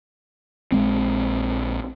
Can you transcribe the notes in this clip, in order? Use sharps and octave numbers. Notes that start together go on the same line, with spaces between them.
A#1 G#3 C4